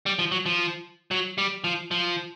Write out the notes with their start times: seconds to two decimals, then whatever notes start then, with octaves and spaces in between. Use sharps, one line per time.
0.06 G3
0.19 F3
0.32 F#3
0.46 F3
1.11 F#3
1.38 G3
1.64 F3
1.91 F3